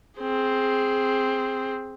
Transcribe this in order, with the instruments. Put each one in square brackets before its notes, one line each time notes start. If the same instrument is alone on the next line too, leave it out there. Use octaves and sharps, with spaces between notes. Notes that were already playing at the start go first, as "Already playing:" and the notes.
[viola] C4 G#4